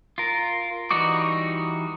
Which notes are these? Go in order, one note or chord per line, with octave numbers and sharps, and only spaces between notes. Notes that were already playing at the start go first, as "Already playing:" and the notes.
F4 A#4
E3 G3 D#4 F#4 D6